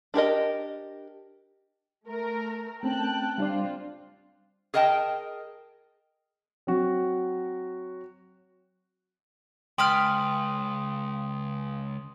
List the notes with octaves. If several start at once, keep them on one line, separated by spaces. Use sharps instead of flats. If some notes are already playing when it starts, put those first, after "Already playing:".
D4 G4 A#4 D#5
A3 A#4
A3 C4 C#4 G5 A5 F#6
G3 C4 D4 F4 D5
G#4 A#4 D#5 G5 A5
F#3 C4 F#4
C#2 G5 B5 C6 D#6 F6 B6